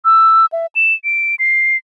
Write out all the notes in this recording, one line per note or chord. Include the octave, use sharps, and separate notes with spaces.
E6
E5
E7
D7
C7